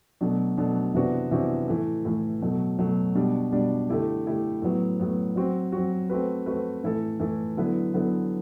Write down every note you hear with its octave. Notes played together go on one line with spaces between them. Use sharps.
B2 F#3 A3 D4
B2 F#3 A3 D4
C3 E3 B3 D4 F#4
C3 E3 B3 D4 F#4
A2 E3 A3
A2 E3 A3
B2 F#3 A3
B2 F#3 A3
B2 G3 D4
B2 G3 D4
D3 A3 E4 G4
D3 A3 E4 G4
A2 F#3 B3
A2 F#3 B3
F#3 C4 F#4
F#3 C4 F#4
A3 C4 F#4 B4
A3 C4 F#4 B4
A2 E3 A3 E4 A4
A2 E3 A3 E4 A4
D3 F#3 B3 E4 B4
D3 F#3 B3 E4 B4